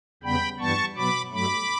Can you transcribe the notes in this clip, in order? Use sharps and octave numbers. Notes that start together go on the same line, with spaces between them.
E2 C#3 G3 B3 G5 B5
G2 E3 G3 B3 A5 C#6
B2 F#3 B3 B5 D6
G2 F#3 A3 B5 D6